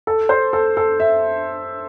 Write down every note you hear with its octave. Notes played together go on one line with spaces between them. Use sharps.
A4
C5
A4
A4
E5